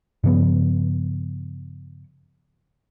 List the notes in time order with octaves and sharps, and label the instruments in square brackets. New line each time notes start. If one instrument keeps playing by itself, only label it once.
[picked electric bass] G2 C#3 F3 B3